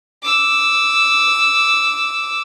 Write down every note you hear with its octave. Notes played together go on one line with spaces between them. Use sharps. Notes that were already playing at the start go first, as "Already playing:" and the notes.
D6 E6